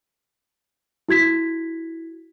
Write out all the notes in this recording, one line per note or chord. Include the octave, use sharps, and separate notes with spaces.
E4 F#4 G#6 B6